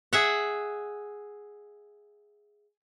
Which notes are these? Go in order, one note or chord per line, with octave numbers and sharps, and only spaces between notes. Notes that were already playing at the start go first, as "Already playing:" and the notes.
G#4 E5 F#5